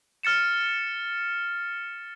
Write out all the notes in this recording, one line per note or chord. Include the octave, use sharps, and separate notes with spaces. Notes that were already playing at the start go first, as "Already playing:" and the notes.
F6 A6 C#7 E7